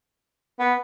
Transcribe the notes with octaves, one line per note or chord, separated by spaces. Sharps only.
B3